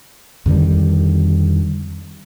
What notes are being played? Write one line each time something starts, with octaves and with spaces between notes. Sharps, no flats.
F2 D3 D#3 G3